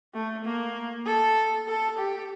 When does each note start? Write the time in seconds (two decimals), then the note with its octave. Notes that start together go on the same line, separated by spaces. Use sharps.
0.14 A3
0.44 A#3
1.06 A4
1.68 A4
1.98 G4